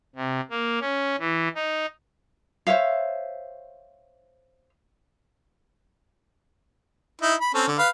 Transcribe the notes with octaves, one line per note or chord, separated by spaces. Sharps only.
C3
A#3
C#4
E3
D#4
C5 C#5 E5 F5
D#4 E4
B5
C4 C#4 A4
D3
B4 F5